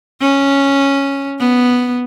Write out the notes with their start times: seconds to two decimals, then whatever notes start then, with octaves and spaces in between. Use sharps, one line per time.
0.21 C#4
1.39 B3